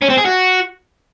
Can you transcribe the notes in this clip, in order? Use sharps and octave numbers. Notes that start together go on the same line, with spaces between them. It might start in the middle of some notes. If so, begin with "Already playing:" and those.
C#4
C4
G#4
F#4